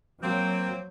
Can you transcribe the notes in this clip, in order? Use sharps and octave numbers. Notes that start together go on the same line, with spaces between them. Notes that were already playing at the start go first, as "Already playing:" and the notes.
F#3 A#3 C4